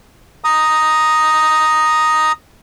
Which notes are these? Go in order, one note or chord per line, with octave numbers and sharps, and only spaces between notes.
A#5 D#6